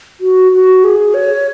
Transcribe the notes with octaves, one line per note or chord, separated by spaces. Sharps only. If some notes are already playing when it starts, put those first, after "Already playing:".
F#4
F#4
G#4
C#5